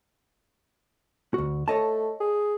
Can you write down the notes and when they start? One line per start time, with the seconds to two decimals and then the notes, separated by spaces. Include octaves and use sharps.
1.34 D2 F#4
1.68 A3 C#5 D#5 A5
2.20 G#4